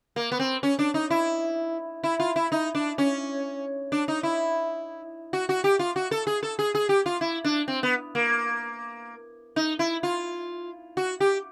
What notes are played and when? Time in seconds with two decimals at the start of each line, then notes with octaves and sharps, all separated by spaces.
0.16 A#3
0.32 B3
0.39 C4
0.63 C#4
0.79 D4
0.94 D#4
1.10 E4
2.04 E4
2.20 F4
2.36 E4
2.52 D#4
2.75 D4
2.98 C#4
3.92 D4
4.08 D#4
4.23 E4
5.33 F#4
5.49 F#4
5.64 G4
5.79 F4
5.96 F#4
6.11 A4
6.27 G#4
6.43 A4
6.59 G#4
6.75 G#4
6.89 G4
7.06 F4
7.21 E4
7.45 D4
7.68 C4
7.83 B3
8.15 A#3
9.56 D#4
9.79 E4
10.03 F4
10.97 F#4
11.20 G4